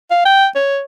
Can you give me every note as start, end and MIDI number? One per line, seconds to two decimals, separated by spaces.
0.11 0.22 77
0.25 0.47 79
0.55 0.81 73